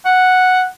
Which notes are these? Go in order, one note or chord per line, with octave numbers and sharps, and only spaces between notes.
F#5